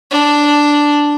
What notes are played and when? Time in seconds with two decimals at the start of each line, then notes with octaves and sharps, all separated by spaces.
0.11 D4